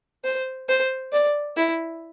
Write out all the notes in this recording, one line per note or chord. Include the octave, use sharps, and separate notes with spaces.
C5
C5
D5
E4